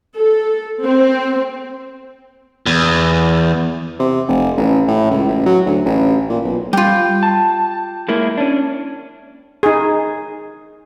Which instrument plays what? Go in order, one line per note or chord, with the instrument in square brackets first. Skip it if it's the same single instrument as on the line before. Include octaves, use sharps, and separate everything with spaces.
[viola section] A4
C4
[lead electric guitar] E2
[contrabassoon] C3
F1
A1
A2
C#2
A1
F#3
D2
A1
A#2
B1
[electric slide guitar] G3 [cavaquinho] F4 G4
[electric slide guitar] A5
G#3 A#3 E4
C#4 D4
[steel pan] D#4 G#4